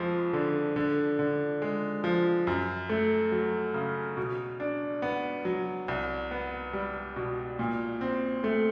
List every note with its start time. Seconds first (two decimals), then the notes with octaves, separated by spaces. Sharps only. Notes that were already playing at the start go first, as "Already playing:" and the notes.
Already playing: F2 F3 G#3
0.33 D3
0.76 D3
1.19 D3
1.62 G#3
2.04 F3
2.47 F#2
2.89 A3
3.32 F#3
3.74 C#3
4.17 B2
4.60 D4
5.02 B3
5.45 F#3
5.88 C2
6.31 B3
6.73 G3
7.16 B2
7.59 A#2
8.01 C4
8.44 A3